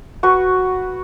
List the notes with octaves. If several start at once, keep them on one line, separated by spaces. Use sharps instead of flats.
F#4 B4 C#6